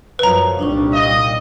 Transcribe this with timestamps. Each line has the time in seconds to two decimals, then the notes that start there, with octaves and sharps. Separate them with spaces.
0.19 F#2 F3 F#3 B4 A#5
0.59 C2 A#2 G3 D4 D#4 C#6
0.92 D#5 F5